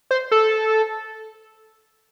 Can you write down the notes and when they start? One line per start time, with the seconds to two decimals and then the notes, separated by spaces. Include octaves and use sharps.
0.11 C5
0.31 A4